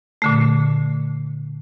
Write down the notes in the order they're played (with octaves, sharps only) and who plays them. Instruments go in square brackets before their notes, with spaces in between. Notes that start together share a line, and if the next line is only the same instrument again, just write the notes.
[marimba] A#2 D3 A3